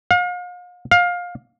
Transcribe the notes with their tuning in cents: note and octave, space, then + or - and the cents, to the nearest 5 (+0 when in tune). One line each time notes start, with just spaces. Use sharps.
F5 +40
F5 +20